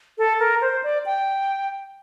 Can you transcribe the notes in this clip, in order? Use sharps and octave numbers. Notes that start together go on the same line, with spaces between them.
A4
A#4
C5
D5
G5